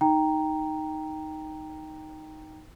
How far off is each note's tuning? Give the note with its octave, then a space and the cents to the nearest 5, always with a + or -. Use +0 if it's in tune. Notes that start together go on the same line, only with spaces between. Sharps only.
D#4 +0 G5 +0 A#5 +0